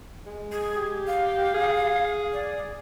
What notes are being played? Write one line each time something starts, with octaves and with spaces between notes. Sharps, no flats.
G#3
G#4
G4
F5
G#4
D5